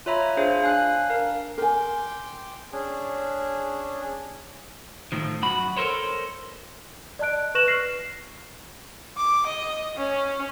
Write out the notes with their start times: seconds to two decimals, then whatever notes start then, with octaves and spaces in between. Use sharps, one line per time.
0.06 F4 C#5 E5 A#5 B5
0.37 D4 G#4 C5 F5
0.62 D4 F5 G#5 F#6
1.10 A#4 F5
1.58 A#4 G5 G#5 C6 D6
2.72 C#4 D4 G#4
5.12 A2 D#3 F3
5.42 F#2 F#4 B5
5.77 A4 A#4 C5 C#5
7.19 D5 D#5 A5 F#6 D7
7.55 B4 C#6 F#6 A#6 E7 F#7
7.68 F6 A#6 C7
9.17 D6
9.46 D#5
9.97 C#4